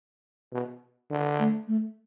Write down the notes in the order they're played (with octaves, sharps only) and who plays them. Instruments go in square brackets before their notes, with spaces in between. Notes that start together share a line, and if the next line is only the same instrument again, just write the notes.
[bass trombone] B2
D3
[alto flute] A3
A3